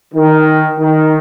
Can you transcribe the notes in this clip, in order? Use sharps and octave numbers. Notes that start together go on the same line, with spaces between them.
D#3
D#3